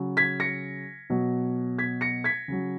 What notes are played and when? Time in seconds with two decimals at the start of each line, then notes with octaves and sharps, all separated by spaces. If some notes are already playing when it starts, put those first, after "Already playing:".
Already playing: C#3 F#3
0.17 G#6 B6
0.40 A#6 C#7
1.10 B2 F#3
1.78 G#6 B6
2.01 A#6 C#7
2.24 G#6 B6
2.48 C#3 F#3